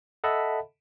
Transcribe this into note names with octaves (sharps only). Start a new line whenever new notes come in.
A4 D#5 E5 F#5 A5 B5